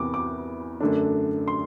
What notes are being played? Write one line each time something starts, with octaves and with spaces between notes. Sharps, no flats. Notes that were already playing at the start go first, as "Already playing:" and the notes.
Already playing: E2 C3 E3 B3 D6
D6
F#2 D3 A3 D4
C6